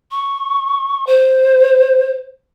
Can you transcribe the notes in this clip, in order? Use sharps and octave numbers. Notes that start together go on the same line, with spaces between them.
C#6
C5